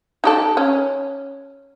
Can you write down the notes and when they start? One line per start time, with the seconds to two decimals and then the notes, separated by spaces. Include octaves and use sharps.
0.24 D#4 G4 A4
0.57 C#4